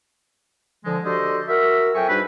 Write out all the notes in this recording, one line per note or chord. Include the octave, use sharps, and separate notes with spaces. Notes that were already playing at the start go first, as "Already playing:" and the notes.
D3 F3 G#3
D4 F#4 G4 A4 C5 D#5
F#4 A#4 E5
F2 F#3 E5 G5 G#5 C#6
G#2 G3 D4 F#4 B4